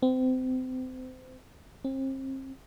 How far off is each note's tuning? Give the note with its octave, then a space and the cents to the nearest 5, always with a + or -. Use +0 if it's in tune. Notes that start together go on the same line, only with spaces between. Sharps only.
C4 -30
C4 +35